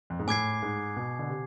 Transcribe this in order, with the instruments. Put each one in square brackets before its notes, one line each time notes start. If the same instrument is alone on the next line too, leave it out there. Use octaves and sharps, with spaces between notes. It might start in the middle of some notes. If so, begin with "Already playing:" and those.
[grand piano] F2
G#2
[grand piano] A2 [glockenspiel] G#5 D6 G#6 C7
[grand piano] G#2
B2
D3
C3